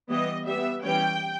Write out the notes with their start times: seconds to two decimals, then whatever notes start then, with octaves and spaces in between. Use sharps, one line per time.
0.09 E3 G3 B3 D#5
0.46 G3 B3 E5
0.83 E3 G3 C#4 G5